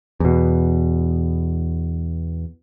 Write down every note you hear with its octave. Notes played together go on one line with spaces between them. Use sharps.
E2 B2